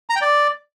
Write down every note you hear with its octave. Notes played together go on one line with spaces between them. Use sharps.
A#5
G5
D5